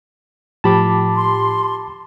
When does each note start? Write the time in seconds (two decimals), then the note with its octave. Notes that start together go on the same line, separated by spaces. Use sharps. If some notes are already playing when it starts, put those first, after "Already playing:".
0.64 A2 F3 G4 A5 B5 D6
1.15 C6